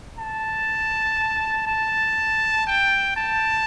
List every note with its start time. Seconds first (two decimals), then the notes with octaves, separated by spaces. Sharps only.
0.19 A5
1.67 A5
2.67 G5
3.17 A5